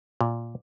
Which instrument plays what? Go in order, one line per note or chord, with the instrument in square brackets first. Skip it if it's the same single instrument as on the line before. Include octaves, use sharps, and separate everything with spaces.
[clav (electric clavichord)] A#2